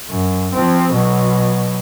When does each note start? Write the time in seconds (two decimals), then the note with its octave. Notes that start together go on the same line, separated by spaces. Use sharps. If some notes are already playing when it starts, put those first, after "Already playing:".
0.10 F#2
0.54 F3 C4
0.93 B2 F#3